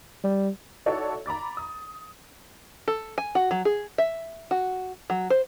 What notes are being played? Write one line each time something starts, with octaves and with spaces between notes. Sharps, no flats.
G3
D#4 E4 F#4 A4 C#5 D5
A#5 B5 D6 A6
D#6
A4
G#5
F#4
F#3
G#4
E5
F#4
F#3
C5